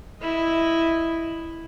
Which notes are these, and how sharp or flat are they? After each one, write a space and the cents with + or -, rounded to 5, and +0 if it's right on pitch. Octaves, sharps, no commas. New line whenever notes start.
E4 +0 D#5 +0